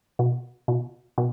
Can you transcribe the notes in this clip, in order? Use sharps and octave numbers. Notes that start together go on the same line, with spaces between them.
B2
B2
B2